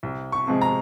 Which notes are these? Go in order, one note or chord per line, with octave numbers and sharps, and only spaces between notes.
C2
C#6
C3 F3 G#3
A#5